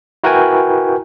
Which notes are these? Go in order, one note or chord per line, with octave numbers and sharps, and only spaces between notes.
E4 F#4 A#4 B4 G5 G#5